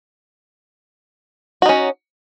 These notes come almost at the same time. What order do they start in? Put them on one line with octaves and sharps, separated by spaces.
F#4 D#4 C#4